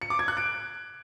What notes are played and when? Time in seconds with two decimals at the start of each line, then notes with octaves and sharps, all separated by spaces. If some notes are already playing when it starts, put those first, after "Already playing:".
0.02 C#7
0.10 D6
0.19 G#6
0.28 F#6
0.37 D7